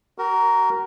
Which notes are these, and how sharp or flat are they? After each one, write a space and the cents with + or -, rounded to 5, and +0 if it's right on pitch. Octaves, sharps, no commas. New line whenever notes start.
F#4 +35 A#4 +0